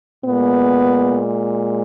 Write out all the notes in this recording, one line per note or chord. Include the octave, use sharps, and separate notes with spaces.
A#2 G#3 B3